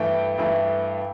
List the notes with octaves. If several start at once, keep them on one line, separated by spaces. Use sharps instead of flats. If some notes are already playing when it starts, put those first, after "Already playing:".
Already playing: G2 E3 A3 G5
G2 E3 A3